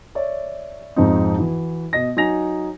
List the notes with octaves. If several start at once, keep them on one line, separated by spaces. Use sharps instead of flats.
C#5 D5 E5
F2 G#2 F3 C4 D#4
E3 E4 F#4
B2 D#5 A#6
F#3 D#4 F#4 G#5 A#6 F7